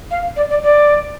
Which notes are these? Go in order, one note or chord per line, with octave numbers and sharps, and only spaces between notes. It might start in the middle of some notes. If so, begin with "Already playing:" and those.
F5
D5
D5
D5